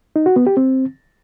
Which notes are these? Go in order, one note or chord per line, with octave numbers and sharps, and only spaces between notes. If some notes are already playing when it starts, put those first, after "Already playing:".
D#4
F#4
B3
G4
C4